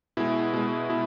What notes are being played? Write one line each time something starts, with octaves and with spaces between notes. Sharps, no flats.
B2 G#3 E4
B2 G#3
B2 E4